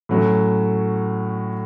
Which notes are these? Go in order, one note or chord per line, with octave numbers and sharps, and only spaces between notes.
A2 F#3 C#4